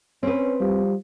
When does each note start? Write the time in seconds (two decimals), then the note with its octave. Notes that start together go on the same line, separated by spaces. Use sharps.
0.23 C4 C#4 B4
0.61 F3 G3